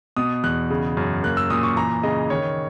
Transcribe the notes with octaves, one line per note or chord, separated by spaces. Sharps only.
B2 D#6
E2 F#6
C#3
F#2
A#3 F#6
E6
A#2 D#6
C#6
E3 A#5
C#3 D#5
D#3 C#5